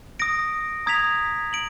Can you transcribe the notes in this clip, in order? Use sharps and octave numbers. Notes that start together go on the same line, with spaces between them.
D#6 A#6 D7
A#5 D#6 G#6 B6 F7
D7 F#7